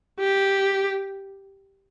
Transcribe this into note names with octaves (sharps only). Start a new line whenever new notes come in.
G4